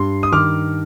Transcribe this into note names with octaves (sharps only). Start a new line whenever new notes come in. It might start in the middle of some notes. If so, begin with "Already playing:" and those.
Already playing: G2 C6
D#6
D#3 D6 F6